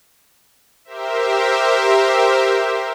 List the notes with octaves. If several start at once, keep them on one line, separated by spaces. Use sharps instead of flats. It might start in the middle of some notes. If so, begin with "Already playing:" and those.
G4 A#4 C5 E5